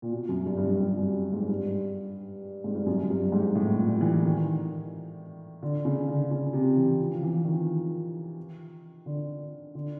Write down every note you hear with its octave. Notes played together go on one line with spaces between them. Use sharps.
A#2
B2
F#2
G2
G2
F#2
G2
F#2
G#2
G2
G#2
G2
F#2
F#2
G2
G#2
A2
A#2
E3
D#3
D3
C#3
D3
C#3
C3
E3
F3
F3
E3
D#3
D3
D3